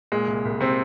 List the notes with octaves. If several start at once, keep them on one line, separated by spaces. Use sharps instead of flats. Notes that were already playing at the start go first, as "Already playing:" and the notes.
A#2 G#3
C2
C2
C3 C4